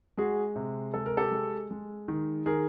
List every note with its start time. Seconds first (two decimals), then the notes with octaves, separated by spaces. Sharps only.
0.17 G#3 F#4 G#4
0.56 C3
0.94 G#3 A4
1.06 A#4
1.17 G4 A4
1.32 G#3
1.71 G#3
2.08 D#3
2.46 D#3 G#4 A#4